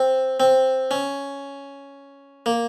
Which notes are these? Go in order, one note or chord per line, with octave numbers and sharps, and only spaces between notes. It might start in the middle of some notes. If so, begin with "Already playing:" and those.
Already playing: C4
C4
C#4
A#3